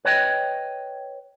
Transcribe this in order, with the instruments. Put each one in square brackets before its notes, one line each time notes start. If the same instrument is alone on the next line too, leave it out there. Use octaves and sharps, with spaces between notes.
[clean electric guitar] B4 C#5 D#5 G5